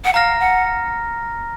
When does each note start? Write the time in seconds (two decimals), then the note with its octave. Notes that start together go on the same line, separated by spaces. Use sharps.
0.05 F#5
0.14 F5 A#5 F6 A#6
0.40 F#5